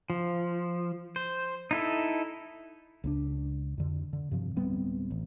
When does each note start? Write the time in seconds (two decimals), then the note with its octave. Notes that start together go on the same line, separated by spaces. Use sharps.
0.10 F3
1.16 C5
1.71 D#4 E4 A4
3.04 C#2 B3 D4
3.78 F2 D3
4.13 D3
4.31 G2 C3 F3
4.56 D1 G3 B3 C4
5.10 A1